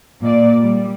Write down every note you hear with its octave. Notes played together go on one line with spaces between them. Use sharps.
A#2 D5
G3